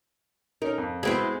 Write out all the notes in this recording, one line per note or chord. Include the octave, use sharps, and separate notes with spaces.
C#4 D#4 A#4
F2
G#3 B3 C4 E4 F#4 G#4